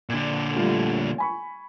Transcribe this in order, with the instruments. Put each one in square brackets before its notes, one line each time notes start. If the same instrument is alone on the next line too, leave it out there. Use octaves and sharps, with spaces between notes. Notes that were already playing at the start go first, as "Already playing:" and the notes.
[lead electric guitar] A#2 D3
[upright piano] G3 A3 F4
G#5 B5 C#6